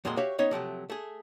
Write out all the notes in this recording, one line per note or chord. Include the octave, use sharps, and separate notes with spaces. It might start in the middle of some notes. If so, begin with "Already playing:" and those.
F2 A#2 D3 G#3 F#4 C6
F#4 G4 C#5 E5 F5
B3 C#4 D#4 C#5 D#5
C3 F3 F#3 A3
A3 G#4